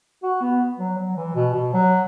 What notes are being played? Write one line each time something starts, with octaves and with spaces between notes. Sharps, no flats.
F#4
B3
F#3
F#3
E3
B2
B2
F#3